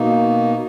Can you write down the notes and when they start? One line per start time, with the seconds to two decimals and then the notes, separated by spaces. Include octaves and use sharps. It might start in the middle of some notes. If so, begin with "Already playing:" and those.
Already playing: B2 A#3 D#4